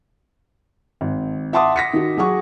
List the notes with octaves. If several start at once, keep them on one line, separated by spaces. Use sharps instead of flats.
G#1
E5 F#5 A5 C6 D6 D#6
A#6 B6 C#7
D#3 F#4
F#3 G#4 F#5 C#6